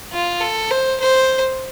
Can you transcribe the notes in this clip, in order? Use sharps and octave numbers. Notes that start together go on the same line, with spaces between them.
F4
A4
C5
C5